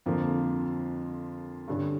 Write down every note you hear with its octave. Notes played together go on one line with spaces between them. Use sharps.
F2 D3 F3 A#3
G2 D3 G3 C#4